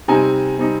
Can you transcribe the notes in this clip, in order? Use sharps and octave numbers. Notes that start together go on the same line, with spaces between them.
C3 G3 C4 D#4 G#5
C3 G3 C4 D#4